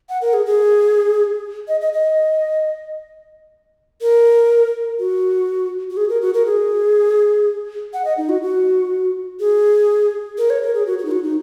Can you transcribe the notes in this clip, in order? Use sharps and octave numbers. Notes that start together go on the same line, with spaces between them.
F#5
A#4
G#4
G#4
D#5
D#5
D#5
A#4
F#4
F#4
G#4
A#4
F#4
A#4
G#4
F#5
D#5
D#4
F#4
F#4
G#4
A#4
C#5
A#4
G#4
F#4
F#4
D#4
F#4
D#4